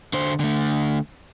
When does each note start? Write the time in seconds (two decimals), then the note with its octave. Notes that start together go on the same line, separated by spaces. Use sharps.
0.13 D3 C5
0.40 D3 A3